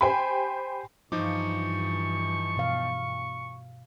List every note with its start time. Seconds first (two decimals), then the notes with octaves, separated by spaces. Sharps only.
0.01 G4 C5 G5 G#5 B5
1.12 G2 E3 F3 D#4 F4 C#6 D6
2.57 B2 F5